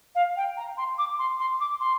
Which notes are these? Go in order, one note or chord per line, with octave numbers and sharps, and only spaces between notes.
F5
G5
A#5
C6
D6
C6
C6
D6
C6